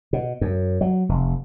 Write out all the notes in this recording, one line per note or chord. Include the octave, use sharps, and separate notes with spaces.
B2
F#2
F#3
F1